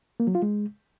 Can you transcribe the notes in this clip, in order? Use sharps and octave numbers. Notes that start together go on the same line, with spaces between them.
A#3
F#3
F4
G#3